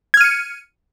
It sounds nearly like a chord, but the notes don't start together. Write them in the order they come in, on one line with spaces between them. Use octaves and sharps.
G#6 F6 D#7 C#7